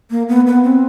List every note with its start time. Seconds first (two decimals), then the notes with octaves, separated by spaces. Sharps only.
0.11 A#3
0.29 B3
0.47 B3
0.64 C4